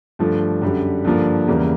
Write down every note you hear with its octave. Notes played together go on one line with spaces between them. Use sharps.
G2 D3 F3 A3
F#2 D3 G3
G2 D3 F3 A#3
E2 C#3 E3 G3 A#3